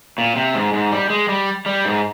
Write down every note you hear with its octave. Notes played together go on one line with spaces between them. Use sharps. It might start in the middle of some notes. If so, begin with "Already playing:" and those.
A#2
C3
G#2
G#2
G3
G#3
G3
G3
G#2